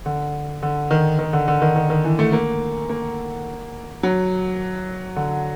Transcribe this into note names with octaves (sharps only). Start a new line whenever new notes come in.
D3
D3
D#3
D#3
D3
D3
D#3
D#3
D#3
E3
A3
A#3
A#3
F#3
D3